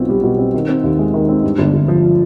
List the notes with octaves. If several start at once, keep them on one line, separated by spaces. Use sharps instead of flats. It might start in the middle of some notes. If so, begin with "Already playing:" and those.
Already playing: B1 B2 C4 F4
G3
B2
C4
D#3
C4
D#2
G#3
D#3
C4
G2
G1
G1
F3